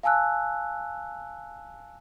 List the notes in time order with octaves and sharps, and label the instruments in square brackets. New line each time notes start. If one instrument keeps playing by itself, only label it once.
[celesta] F5 G#5 A5 E6 F#6